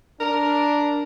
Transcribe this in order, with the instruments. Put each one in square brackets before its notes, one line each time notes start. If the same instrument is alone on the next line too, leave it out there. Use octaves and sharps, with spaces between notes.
[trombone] D4 [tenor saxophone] A#4